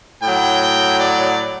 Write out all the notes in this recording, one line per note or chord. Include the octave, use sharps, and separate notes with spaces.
A2 F#3 G5
D5